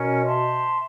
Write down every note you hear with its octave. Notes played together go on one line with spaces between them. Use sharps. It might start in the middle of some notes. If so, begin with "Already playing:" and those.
Already playing: B2 C#4 A#4
C5 E5 A5 C6